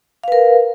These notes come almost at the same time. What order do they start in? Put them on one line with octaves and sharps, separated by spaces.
F5 B4 A#4